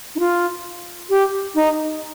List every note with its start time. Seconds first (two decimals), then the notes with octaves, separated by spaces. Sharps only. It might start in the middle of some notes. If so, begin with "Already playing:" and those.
0.15 D#4
0.20 F4
1.10 G4
1.55 D#4